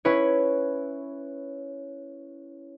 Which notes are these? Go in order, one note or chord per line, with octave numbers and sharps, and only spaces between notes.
C#4 E4 B4 C#5